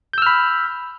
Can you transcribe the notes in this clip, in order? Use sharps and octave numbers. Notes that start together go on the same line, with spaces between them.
B5 E6 F6 G6